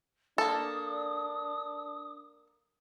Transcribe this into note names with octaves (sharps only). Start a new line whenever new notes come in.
A#3 D4 A4 D#6